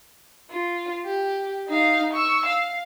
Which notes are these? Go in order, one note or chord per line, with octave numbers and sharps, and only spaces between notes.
F4
G4
D#4 F5
C#6 E6
F5